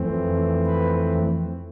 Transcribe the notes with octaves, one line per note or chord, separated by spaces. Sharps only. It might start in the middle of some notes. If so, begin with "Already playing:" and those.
Already playing: F2 E3 A3 C4
B4